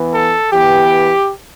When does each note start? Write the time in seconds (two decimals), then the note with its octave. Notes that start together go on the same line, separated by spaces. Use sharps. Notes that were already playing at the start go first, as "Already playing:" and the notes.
Already playing: E3 B3
0.13 A4
0.51 E3 B3 G4